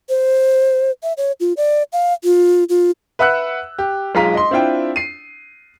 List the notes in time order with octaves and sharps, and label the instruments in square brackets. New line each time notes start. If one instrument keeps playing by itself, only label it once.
[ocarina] C5
E5
C#5
F4
D5
F5
F4
F4
[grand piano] B4 E5 F#5 E6 F#6
G4
B1 G#3 F4 F5 A#5 B6
D#5 C6
C4 D4 E4 F4 G5
C7 D#7